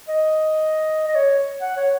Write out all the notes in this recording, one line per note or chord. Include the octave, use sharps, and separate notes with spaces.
D#5
D#5
C#5
F#5
C#5